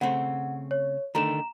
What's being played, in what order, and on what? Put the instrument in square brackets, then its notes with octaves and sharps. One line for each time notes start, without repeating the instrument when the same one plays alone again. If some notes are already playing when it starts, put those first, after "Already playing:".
[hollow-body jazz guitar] C#3 A3 C4 [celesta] F#5
[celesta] C#5
[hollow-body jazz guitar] D3 D#3 A3 [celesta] A#5 E7